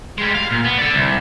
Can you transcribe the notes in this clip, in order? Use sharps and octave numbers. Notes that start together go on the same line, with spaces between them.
G3 G#3
F5
A#2
B3
A4 D5
C2